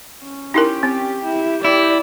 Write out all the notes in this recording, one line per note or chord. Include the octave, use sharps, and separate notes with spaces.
C#4
D#4 E4 G4 A#4
C4
E4
E4 D5